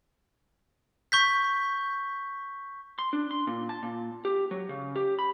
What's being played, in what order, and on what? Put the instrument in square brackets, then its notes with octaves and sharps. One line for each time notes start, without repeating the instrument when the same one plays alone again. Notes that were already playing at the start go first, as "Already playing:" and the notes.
[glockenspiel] C#6 G6 B6
[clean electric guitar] C6
D4
C6
A#2
A5
A#2
G4
F#3
C#3
G4
B5